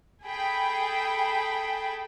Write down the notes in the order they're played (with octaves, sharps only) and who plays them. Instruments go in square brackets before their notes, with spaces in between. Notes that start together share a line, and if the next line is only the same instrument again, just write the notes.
[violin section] G#4 A4 G5 B5